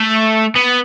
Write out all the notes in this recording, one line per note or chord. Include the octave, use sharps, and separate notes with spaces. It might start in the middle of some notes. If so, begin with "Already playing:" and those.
Already playing: A3
B3